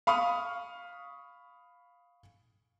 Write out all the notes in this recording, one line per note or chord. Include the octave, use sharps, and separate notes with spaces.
F5 B5 C#6 D#6 F6